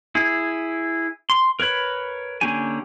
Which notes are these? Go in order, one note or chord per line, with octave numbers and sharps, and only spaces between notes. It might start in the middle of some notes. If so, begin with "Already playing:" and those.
E4 G#4
C6
A#4 B4 C#5 B5
D3 A#3 C#4 G4 G#5